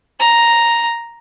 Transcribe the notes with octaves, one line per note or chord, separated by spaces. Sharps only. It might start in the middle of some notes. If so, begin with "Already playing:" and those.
A#5